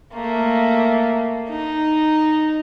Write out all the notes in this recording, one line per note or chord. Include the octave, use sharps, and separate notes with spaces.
A3 A#3
D#4